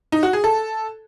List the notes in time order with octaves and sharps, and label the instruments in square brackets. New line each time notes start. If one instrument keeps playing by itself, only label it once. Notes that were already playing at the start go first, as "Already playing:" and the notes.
[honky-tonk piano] D#4
F#4
G#4
A4